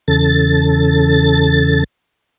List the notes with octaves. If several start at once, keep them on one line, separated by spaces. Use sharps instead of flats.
E2 C#3 A4 A6